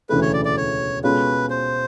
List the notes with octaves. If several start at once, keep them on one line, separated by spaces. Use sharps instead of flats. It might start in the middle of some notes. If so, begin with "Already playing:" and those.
E1 D2 C#3 E3 A3 B4
C#5
D5
D5
C#5
B2 G#3 C#4 F4 A4 B4
C5